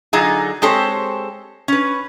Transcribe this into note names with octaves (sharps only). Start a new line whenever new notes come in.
D3 F#3 D#4 F4 G#4
G#3 C4 G4 A4 C5 C#5
C#4 B4